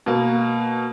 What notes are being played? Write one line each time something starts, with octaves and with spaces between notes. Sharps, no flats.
B2 A#3